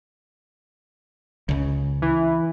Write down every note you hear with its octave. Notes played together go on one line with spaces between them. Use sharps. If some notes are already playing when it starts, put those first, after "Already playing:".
C#2 C#3
E3